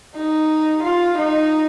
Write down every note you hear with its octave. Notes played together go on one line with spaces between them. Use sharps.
D#4
F4
D#4